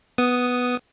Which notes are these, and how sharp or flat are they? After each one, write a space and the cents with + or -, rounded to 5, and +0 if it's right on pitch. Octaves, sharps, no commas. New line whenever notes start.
B3 +0 D#6 +0